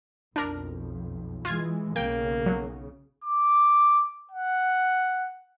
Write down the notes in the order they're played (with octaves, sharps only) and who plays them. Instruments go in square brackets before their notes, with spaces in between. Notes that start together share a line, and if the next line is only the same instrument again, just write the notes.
[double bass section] B1 F2 [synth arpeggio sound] D4 A#4
[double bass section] E3 G#3 [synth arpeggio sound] F4 G#6
[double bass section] B1 C#3 [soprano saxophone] A#3 [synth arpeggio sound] G5
[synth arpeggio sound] F#3
[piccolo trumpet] D6
F#5